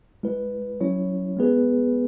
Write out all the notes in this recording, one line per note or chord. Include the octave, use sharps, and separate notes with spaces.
G#3 E4 B4
F#3 C#4 E4 C#5
G#3 B3 G#4 B4